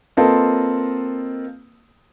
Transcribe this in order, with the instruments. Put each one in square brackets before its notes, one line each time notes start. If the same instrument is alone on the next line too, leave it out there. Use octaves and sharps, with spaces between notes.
[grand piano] A#3 C4 F4 A4 B4 D#5